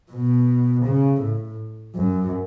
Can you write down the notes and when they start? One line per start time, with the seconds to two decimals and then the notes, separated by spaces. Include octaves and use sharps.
0.11 B2
0.85 C#3
1.21 A2
1.95 F#2